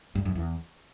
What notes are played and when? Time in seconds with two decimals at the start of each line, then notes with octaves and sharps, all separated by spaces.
0.15 G2
0.25 F#2
0.35 E2